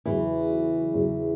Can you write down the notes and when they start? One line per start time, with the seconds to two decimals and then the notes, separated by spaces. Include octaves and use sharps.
0.05 E2 C#3 E3 F#3
0.94 E2 C#3 F#3